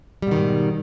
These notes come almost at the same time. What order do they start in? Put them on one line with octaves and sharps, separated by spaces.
G3 B2 D#3 G#2